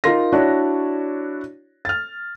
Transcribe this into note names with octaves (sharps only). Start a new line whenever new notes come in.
D#4 F4 A#4 C6 A#6
D4 E4 F#4 C#5 D5
F6 A6